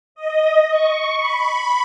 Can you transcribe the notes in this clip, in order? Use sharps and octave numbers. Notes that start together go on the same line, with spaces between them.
D#5
C#6
B5